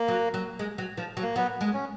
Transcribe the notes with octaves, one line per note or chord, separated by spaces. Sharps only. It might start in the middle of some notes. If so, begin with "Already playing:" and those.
Already playing: A#3
F#3
F#3
G#3
F#3
F3
F#3
A#3
F#3 B3
G#3
C#4